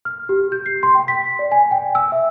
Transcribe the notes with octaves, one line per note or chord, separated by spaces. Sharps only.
F6
G4
G6
C7
C6
G5
B6
D5
G#5
G5
E6
E5